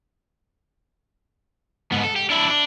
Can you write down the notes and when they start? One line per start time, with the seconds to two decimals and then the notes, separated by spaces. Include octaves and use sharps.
1.92 G#2 B3
2.03 A4
2.16 G4
2.30 D4 E4
2.49 D4